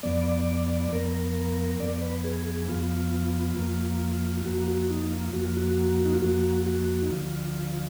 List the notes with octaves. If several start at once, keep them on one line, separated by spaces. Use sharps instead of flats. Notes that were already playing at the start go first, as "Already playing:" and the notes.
F2 F3 B3 D5
F2 F3 B3 A#4
F2 F3 B3 D5
B4
G#4
G#4
F2 F3 B3 F4
F2 F3 A#3
F4
F2 F3 A#3 F#4
F#4
D#4
F4
F2 F3 A#3 F#4
F4
F#4
D#4
F4
F2 F3 A#3 F#4
F#4
D#4
D2 D3 F3 F4